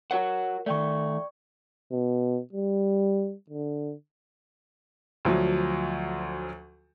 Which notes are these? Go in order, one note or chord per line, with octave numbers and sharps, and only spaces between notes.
F#4 A#4 C#5 F#5
D#3 A3 D5 G5 C#6
B2
G3
D3
D2 F3 F#3